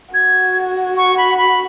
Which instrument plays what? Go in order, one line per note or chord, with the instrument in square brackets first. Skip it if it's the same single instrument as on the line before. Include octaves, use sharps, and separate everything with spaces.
[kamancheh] F#4 [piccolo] G#6
[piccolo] C#6
B5
B5